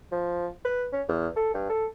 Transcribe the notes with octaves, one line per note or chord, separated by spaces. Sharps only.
F3
B4
C#4
E2
A4
G2
A4